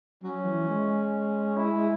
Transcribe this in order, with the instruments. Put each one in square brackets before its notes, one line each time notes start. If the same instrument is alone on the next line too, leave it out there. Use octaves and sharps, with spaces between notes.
[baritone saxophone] F#3 [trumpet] C#4
[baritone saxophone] E3
G#3
[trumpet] E4